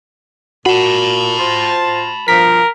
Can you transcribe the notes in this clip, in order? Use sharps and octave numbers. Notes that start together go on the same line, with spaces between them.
A#2 F#4 A5 B5
F4 C5
G2 B2 F3 A#4 B6